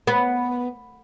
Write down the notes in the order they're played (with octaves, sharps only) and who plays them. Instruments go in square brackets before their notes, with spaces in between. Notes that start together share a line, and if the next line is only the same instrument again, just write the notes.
[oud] B3